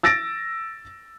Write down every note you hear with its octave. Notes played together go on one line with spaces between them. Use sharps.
E6 A6 A#6 D7